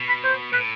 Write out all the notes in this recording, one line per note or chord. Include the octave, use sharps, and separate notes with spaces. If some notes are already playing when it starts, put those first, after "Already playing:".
Already playing: B2
B5
C5
A2 B4